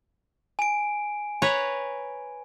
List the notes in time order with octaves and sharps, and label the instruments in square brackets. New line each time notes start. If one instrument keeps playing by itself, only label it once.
[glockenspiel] G#5 D7
[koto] B4 C#5 A#5